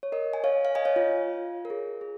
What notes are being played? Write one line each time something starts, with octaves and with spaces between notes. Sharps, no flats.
C#5
A#4 D#5
G#5
C#5 F5
F5
D#5 G#5
C#5 F5
F4
A#4
G#4
G#4